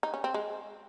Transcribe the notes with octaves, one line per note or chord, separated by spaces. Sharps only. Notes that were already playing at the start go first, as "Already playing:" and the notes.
D#4
C#4
C4
G#3